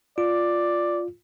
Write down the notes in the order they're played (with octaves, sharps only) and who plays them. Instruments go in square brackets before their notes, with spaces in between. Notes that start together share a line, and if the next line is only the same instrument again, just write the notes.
[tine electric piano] F4 [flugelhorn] D5